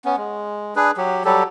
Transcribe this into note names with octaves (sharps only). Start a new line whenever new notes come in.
B3 C#4
G#3
D4 G#4 B4
F#3 G4
F#3 G3 G4 A4